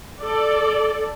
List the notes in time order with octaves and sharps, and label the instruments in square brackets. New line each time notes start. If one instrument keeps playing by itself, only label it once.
[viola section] A4 D5